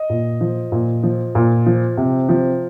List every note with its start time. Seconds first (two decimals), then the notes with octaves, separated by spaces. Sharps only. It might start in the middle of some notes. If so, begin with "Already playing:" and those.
Already playing: D#5
0.10 A#2
0.41 F3
0.72 A#2
1.03 F3
1.35 A#2
1.66 F3
1.97 C3
2.29 F3